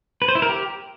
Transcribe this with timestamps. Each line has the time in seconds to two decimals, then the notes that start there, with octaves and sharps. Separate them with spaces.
0.22 B4
0.28 C5
0.35 E4
0.42 A#4
0.49 G4